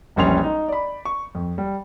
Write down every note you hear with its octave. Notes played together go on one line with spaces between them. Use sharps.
E1 A#1 G3 C#4 C6 F7
D#4
D5 B5
C#6
F2
G3